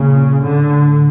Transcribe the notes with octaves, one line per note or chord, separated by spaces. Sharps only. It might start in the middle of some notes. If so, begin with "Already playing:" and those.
Already playing: A#2 C#3
A2 D3